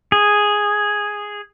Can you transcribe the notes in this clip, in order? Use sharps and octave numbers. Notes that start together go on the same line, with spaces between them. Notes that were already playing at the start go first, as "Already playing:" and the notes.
G#4